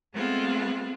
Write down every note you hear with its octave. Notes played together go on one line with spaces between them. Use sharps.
G#3 A3 B3 C4 F4